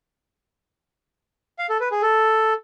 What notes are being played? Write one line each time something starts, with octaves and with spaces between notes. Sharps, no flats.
F5
A4
B4
G#4
A4